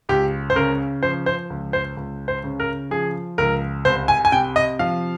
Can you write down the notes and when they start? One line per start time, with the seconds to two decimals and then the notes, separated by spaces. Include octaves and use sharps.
0.09 C#2 G4
0.50 C5
0.56 C#3 A#4
1.03 F3 C5
1.26 C5
1.50 C#2
1.73 C5
1.97 C#2
2.28 C5
2.44 C#3
2.60 A#4
2.91 F3 G#4
3.38 C#2 A#4
3.85 C2 C5
4.08 G#5
4.25 G#5
4.32 C3 G5
4.56 D#5
4.79 F3 F5